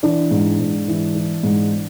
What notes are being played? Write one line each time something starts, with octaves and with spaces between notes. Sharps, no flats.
E3 D4 D5
G#2
G#2
E3
E3
G#2